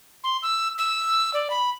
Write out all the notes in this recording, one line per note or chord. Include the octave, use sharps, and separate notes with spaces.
C6
E6
E6
D5
B5